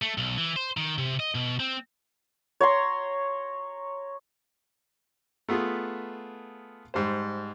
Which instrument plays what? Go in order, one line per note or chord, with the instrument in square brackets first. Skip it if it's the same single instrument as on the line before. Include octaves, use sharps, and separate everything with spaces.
[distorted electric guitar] A3
B1
E3
C5
D#3
C3
D#5
B2
C4
[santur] C#5 A#5 C6
[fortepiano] A3 B3 F4 G#4
G#2 G3 C5